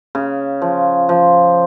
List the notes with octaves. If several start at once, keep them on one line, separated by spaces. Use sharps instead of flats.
C#3
F3
F3